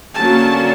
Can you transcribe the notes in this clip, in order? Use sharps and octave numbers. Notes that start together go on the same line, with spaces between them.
D3 F#3 A#3 C#4 A5